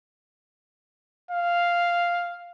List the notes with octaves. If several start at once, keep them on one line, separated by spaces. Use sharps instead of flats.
F5